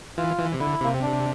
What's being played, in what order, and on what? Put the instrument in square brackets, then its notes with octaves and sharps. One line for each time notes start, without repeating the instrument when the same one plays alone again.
[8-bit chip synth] E3 [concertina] F4
[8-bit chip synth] E3
C3
[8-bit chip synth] D3 [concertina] E4
[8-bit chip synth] C3 [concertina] A#3
[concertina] C4
D4